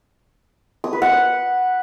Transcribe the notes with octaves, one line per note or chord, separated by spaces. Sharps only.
D#6
B4
F#5